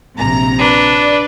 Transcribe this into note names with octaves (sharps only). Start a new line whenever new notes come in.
A#1 C3 A#5
D4 B4
D5